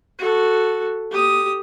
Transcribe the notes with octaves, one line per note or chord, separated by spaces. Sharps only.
F#4 A4
G4 D#6